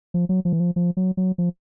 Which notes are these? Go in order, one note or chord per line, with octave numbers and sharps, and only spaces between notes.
F3
F#3
F3
E3
F3
F3
F#3
F#3
F3